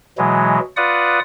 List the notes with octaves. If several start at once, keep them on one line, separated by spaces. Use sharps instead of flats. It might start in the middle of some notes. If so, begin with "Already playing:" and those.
B2 E3 F#3 G#3
F4 B4 D5 F#5 D#6